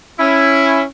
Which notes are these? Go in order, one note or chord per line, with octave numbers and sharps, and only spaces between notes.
C#4 E4